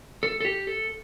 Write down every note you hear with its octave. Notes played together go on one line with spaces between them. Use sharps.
A4
A4
G4
A4